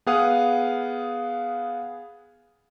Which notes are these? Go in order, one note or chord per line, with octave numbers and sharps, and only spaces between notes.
B3 G#4 F5 F#5 D#6